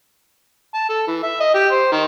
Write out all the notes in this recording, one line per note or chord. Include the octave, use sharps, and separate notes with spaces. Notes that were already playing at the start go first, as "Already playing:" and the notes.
A5
A4
E3
E5
D#5
G4
C5
D#3